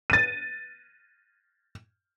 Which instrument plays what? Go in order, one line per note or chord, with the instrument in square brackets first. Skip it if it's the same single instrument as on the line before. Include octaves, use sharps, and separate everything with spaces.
[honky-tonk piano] A6 D#7